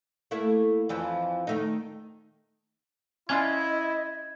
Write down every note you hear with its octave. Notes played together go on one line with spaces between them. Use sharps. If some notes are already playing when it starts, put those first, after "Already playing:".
A3 A#3 E4
F2 E3 F3
D#3 A3 D#4
C#4 D4 E4 F4 D#5 G#6